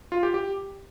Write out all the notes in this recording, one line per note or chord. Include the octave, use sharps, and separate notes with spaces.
F4
G4
G4